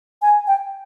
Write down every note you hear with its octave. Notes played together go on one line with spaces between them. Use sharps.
G#5
G5